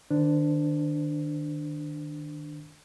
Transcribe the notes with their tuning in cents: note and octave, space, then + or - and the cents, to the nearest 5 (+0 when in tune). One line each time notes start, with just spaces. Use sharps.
D#3 -25 D4 +0 C5 -35